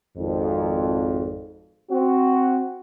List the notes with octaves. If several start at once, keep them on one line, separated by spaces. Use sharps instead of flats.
G#1 F2
C4 F#4